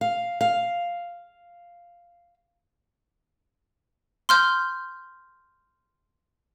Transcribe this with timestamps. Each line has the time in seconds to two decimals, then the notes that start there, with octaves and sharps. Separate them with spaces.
0.01 F5
0.41 F5
4.29 C6 F6 G6